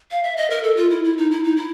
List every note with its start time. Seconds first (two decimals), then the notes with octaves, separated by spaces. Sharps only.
0.11 F5
0.23 E5
0.37 D#5
0.50 A#4
0.63 A4
0.77 F4
0.90 E4
1.04 E4
1.18 D#4
1.31 E4
1.44 D#4
1.57 E4